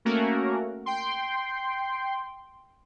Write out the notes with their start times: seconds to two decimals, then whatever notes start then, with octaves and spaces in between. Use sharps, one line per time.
0.05 A3 A#3 C#4 F#4 A#4
0.86 G5 C6